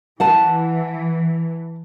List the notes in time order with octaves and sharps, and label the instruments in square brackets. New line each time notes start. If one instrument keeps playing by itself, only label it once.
[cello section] E3 [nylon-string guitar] F#5 A5